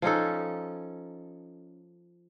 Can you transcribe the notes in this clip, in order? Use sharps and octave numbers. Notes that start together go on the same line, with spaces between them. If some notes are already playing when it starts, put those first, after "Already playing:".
F3 C#4 D#4 A4